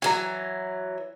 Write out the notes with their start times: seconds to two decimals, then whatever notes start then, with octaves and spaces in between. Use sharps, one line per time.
0.02 E3 F#3 G#5 A#5